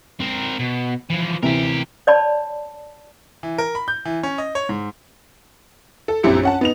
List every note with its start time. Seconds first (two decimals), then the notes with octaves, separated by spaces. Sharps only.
0.20 C4 A#4
0.59 B2
1.10 E3 F3
1.43 C3 E3 G4 A#4
2.07 C#5 D5 A5 B5
3.43 E3
3.58 A#4
3.75 B5
3.88 G6
4.05 E3
4.23 C#4
4.38 D#5
4.55 C#5
4.69 G#2
6.08 A4
6.23 A#1 F#2 C4 E4 G4 C#7
6.43 C#4 F#5 A5
6.61 B3 D#4 F7